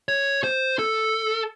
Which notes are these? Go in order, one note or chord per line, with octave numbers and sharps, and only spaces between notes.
C#5
C5
A4